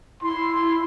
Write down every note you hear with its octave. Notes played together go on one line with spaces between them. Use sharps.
E4 C6